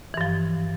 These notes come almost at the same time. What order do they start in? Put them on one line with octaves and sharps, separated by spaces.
E3 G2 F3